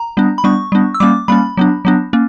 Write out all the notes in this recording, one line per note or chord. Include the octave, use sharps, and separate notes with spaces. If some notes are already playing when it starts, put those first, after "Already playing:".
Already playing: A#5
G3 B3 D4
B5
G3 B3 D4 C#6
G3 B3 D4
E6
G3 A#3 C#4 D6
G3 A#3 C#4 B5
F#3 B3 D4
F#3 B3 D4
A#3 C#4